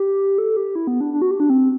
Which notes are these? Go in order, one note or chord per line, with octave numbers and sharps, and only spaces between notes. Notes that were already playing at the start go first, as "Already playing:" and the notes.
Already playing: G4
A4
G4
E4
B3
D4
D4
F#4
G4
D4
C4